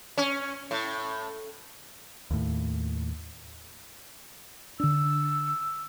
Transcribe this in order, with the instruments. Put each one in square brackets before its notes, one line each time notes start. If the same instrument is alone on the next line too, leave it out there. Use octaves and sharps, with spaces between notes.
[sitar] C#4
A2
[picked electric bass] D#2 A2
[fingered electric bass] D3 D4 [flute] E6